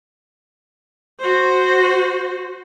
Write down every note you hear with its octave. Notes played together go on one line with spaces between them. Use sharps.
F#4 C5